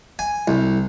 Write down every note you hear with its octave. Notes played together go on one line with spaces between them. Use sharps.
G#5
C2